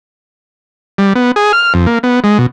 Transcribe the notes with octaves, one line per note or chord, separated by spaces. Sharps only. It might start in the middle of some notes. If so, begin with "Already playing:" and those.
G3
B3
G#4
F6
F2
A#3
B3
G#3
B2